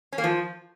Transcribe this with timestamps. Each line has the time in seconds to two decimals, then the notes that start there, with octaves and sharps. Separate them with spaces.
0.13 C#4
0.18 A#3
0.24 F3